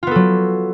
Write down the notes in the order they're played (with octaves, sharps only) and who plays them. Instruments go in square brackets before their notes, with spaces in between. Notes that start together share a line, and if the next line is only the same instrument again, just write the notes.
[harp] F4
B3
A4
F#3